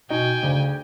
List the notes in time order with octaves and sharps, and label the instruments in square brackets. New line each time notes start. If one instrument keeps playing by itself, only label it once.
[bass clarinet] B2 [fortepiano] D#4 F#4 D#5 [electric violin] G5 G#5
[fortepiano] D2 [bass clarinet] C#3